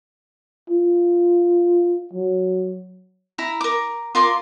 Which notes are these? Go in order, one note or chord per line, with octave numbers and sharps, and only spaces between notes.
F4
F#3
E4 A#5 B5
A#4 D6
F4 A#4 C6 D6